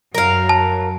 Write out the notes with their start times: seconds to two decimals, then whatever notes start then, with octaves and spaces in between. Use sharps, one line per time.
0.15 F#2 F#3 A#4 F5
0.49 A5